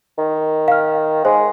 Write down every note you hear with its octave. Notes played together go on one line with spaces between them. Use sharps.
D#3
F5 F6
G#3 C5